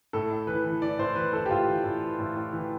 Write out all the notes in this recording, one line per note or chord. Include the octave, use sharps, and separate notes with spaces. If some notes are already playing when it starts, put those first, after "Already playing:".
A2 A4
A2
E3 B4
E3
E3 D5
A2 C5
E3 B4
E3 A4
G4
A2 F4
E3
A2
E3
A2
A2
E3